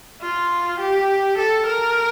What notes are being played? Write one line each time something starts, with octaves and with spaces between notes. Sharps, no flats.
F4
G4
A4
A#4